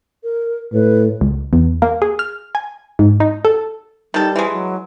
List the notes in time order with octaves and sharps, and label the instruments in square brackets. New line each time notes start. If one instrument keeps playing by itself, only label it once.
[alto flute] A#4
[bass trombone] A2 [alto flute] B4
[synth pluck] C#2
E2
A#3
G#4
F6
G#5
G#2
D#4
A4
[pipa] D#3 A4 [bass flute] G3
[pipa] E3 G#3
[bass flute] F#3